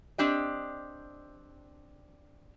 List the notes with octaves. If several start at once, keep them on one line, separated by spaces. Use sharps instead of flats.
C4 D4 G4 D#5